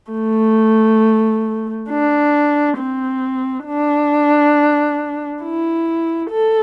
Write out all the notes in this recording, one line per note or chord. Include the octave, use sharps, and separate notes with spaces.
A3
D4
C4
D4
E4
A4